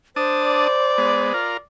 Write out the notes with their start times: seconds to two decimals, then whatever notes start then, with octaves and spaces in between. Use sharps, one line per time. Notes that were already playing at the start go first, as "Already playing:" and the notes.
0.16 D4 C5 A5 D#6
0.45 D5
0.98 G#3 B3
1.34 F4 A#4